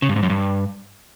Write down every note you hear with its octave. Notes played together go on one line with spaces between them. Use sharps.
C#3
G2
G#2
F#2
G2